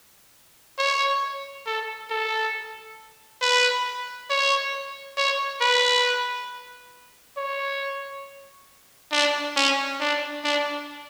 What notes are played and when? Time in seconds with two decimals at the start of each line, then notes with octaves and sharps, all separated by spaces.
0.78 C#5
1.66 A4
2.10 A4
3.41 B4
4.30 C#5
5.17 C#5
5.61 B4
7.37 C#5
9.12 D4
9.56 C#4
10.00 D4
10.44 D4